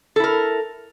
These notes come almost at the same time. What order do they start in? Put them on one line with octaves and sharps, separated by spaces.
A4 E4 A#4